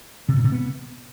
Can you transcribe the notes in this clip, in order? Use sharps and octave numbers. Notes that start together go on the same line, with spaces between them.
C3
A#2
C3
B3